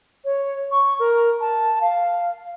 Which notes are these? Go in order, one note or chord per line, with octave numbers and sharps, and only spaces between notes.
C#5
C#6
A#4
A5
F5